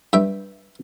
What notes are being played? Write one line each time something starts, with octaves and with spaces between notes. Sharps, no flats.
G2 E5 G5